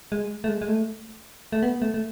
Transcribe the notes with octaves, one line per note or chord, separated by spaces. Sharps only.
G#3
A3
G#3
G#3
A3
A3
B3
A3
A3